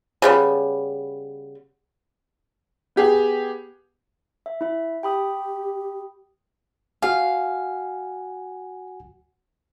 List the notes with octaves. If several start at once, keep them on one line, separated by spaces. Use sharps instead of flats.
C#3 G3 B3
B3 G4 G#4
E5
E4 E5
G4 G5 B5 D#6
F#4 F5 F#5 G#5